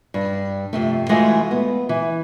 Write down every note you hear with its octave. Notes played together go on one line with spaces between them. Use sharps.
G2
F2 C3 A3
E3 G#3 A3 F4 F#4
B3
E3